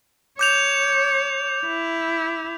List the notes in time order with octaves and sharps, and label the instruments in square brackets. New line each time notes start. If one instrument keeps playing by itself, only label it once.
[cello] C#5 [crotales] D6 G6 F7
[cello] E4